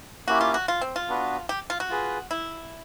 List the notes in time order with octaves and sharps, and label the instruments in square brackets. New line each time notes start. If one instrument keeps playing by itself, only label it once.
[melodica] A#3 C#4 E4 G4 [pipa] F#4
[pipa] F4
F#4
F4
C4
F4
[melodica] B3 D4 F#4 B4
[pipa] G4
F4
F#4
[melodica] F4 G#4 B4
[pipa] E4